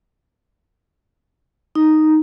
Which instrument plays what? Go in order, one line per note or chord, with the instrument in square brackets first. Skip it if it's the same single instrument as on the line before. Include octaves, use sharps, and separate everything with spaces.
[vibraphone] D#4